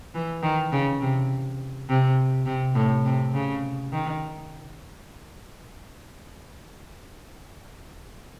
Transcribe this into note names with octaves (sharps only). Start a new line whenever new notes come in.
E3
D#3
C#3
C3
C3
C3
A2
C3
C#3
D#3